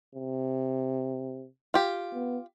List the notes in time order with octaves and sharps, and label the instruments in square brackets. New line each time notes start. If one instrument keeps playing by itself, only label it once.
[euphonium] C3
[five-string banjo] F4 G4
[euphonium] B3